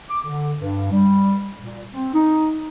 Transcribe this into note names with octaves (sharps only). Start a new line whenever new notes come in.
D6
D3
G2
G3
A#2
C4
D#4